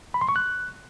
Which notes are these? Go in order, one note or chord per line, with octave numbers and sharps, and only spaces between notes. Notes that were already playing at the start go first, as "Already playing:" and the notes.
B5
C6
C#6
F#6